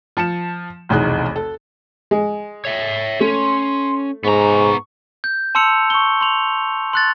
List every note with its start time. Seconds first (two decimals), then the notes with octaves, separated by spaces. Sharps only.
0.17 F3 A5 C#7 E7
0.89 F1 B1 E2 D#4 G#4 F#6
1.36 A4
2.11 G#3
2.65 C#5 E5
3.20 A3 C#4 C6
4.24 G#2 B3 A#5 C#6
5.24 G6
5.55 A5 C6 E6 C#7 F7
5.90 C#6 G7
6.21 C6 F7
6.93 C6 F#6 A6